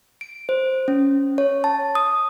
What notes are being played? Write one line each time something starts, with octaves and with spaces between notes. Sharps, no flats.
D7
C5
C#4
C#5
A5
D#6